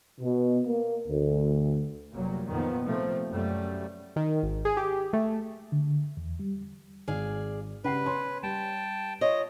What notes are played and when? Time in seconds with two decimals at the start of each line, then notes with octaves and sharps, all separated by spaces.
0.20 B2
0.64 A#3
1.07 D2
2.13 F1 F#3 G3 A#3
2.49 F2 A#2 D#3 F3 B3
2.84 C3 F3 A3 A#3 C4
3.30 F#2 G3 A3
4.16 D#3
4.43 G#1
4.65 G#4
4.77 G4
5.13 A3
5.72 D3
6.17 E2
6.39 G3
7.08 G#1 G#4 D5 F5
7.84 C#3 G3 B4 F#5 C7
8.06 C#4 C6
8.43 G3 G5 A5
9.21 F4 C#5 D#5